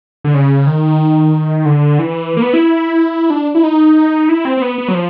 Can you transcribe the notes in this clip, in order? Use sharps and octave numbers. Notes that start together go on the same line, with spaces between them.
D3
C#3
D#3
D3
E3
A#3
B3
E4
D4
E4
D#4
E4
C4
C4
B3
B3
F#3
F3